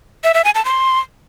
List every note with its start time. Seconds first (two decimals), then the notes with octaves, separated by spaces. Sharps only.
0.24 E5
0.34 E5
0.44 G#5
0.55 A5
0.65 C6